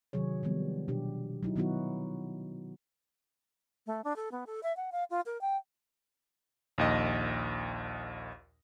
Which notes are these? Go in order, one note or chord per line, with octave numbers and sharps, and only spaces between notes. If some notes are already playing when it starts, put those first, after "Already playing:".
C3 D#3 F#3 G#4 C#5
D#3 F3 G3 B3
B2 D4 G4
F#3 D#4 E4
D#3 F#3 B3 D#4 E4 F#4
A3
D4
A4
B3
A4
E5
F#5
F5
F4
A#4
G5
A#1 D#2 D#5